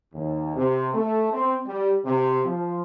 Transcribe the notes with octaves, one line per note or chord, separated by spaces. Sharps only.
D#2
C3
A3
C4
G3
C3
F3